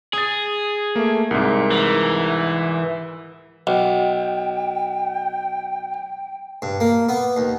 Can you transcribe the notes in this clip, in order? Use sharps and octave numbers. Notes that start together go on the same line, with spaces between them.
G#4 D#6 A6
A3 A#3
C2 G#2 A#4
E3
B1 G5
G2
A#3
B3
D#2